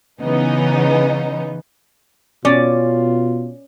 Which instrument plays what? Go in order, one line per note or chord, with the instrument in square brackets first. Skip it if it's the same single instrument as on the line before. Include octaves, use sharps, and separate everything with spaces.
[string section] C#3 E3 B3 D#4
[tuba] B2 [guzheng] C#4 [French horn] F4 [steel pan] D5